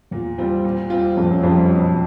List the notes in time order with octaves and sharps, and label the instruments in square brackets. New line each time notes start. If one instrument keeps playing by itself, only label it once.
[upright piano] E2 [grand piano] A#2
[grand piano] G3 C4 F4
A#2
G3 C4 F4
[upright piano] F2 [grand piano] A#2
[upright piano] F#2
[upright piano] F2 [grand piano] G3 C4 F4
[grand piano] B2